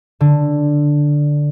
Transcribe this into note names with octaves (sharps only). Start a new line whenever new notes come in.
D3